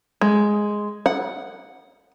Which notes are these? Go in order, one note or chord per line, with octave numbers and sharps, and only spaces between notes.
G#3
F#5